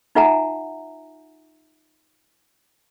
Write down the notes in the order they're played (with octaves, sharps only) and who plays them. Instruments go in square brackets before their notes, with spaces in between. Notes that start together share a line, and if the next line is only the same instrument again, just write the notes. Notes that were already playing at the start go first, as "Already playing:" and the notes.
[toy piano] D#4 F4 E5 F#5 G#5 A#5